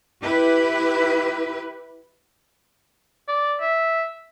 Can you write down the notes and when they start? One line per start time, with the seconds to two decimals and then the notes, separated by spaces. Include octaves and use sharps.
0.23 E4 G4 B4
3.28 D5
3.61 E5